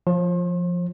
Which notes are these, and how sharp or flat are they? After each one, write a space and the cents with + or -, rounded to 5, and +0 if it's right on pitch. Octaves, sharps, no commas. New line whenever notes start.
F3 +0 C5 +40